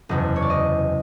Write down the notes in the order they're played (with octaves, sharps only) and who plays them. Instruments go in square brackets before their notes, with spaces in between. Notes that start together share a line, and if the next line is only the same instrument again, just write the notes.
[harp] F#1 E2 C3 D#5
C#5
D5
D#5